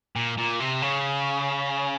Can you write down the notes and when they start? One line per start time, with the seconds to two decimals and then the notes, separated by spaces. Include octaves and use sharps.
0.16 A#2
0.38 A#2
0.60 C3
0.82 C#3